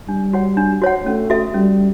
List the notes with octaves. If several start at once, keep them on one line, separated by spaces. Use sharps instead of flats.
G3 D4
F#4 C#5 F#5
D4
F#4 C#5 F#5
A3 C#4
F#4 A4 E5
G3 C#4